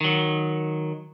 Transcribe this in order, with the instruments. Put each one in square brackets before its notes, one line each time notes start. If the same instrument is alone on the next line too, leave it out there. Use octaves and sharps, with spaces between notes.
[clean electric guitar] D#3 F#3